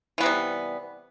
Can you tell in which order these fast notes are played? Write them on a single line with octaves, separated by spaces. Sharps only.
E3 B3 C3 G3